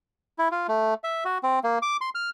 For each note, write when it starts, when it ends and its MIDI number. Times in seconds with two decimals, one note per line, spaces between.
0.38 0.48 64
0.52 0.67 65
0.68 0.94 57
1.04 1.24 76
1.25 1.38 66
1.43 1.59 60
1.64 1.79 58
1.82 1.97 86
2.01 2.10 84
2.15 2.30 89